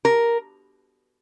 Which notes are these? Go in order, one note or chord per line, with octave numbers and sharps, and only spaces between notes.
A#4